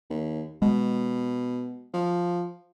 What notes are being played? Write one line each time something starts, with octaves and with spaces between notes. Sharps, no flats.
D#2
B2 G#3
F3